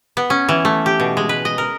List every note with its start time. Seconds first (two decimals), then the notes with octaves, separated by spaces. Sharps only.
0.17 B3
0.30 C#4
0.49 E3
0.65 A3
0.86 G4
1.00 B2
1.17 G#3
1.29 B4
1.45 D#5
1.58 A#4